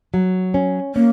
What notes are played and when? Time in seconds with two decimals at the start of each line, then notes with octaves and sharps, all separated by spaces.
0.14 F#3
0.54 C#4
0.95 A#3 C#4